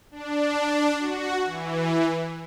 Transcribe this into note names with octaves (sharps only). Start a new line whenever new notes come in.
D4
F#4
E3